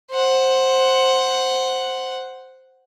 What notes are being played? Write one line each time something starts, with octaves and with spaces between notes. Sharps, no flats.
C5 F#5